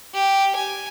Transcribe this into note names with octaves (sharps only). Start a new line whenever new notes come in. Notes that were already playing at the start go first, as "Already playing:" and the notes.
G4
G#5